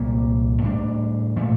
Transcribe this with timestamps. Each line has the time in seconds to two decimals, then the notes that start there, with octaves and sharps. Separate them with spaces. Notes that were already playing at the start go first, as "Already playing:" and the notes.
Already playing: C2 A#2 G3 A#3
0.62 A2 G3 D4
1.36 A#2 F3 A3